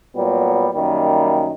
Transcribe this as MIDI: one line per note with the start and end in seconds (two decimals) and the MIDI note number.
0.16 0.69 46
0.16 0.69 54
0.16 0.69 55
0.16 0.69 59
0.74 1.51 42
0.74 1.51 51
0.74 1.51 55
0.74 1.51 58